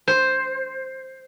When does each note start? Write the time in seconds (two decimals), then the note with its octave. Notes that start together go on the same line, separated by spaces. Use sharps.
0.08 C5